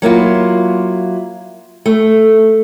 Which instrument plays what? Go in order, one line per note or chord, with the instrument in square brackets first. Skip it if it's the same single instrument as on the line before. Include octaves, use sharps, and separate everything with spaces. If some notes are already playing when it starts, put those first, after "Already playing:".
[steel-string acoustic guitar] F#3 A#3 E4 F4
A3